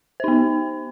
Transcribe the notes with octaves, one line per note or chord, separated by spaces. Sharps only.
B3 D#4 C5